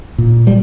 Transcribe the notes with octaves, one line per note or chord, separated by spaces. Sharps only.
A#2
G3